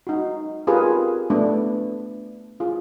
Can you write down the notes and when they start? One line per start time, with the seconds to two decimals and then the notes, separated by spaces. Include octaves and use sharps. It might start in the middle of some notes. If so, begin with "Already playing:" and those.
0.07 D#4 F#4
0.67 C4 F4 G4 G#4 A#4 B4
1.30 A3 B3 D4
2.60 F4 G#4